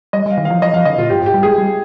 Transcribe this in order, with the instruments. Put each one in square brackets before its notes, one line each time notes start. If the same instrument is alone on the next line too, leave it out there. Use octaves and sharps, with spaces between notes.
[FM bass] G3 [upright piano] D#5
[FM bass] G3 [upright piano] F5
[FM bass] D#3
[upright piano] F5
[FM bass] F3
[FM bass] F3 [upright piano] D#5
[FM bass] F3 [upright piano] F5
[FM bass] D3 [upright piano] D#5
[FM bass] A#2 [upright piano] F4
[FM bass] G#2 [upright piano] G4
[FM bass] G#2 [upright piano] G4
[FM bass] G3
[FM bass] G#3 [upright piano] G#4
[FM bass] G3